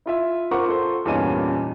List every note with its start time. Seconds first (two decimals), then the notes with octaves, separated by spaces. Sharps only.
0.06 E4 F4 E5
0.51 F4 A#4 C5 F#5 C#6 D6
0.66 F4 A4 C5
1.05 E2 G2 A#2 C#4 D#4 D#7